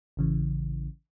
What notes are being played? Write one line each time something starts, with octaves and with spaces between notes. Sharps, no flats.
A1 C#3 E3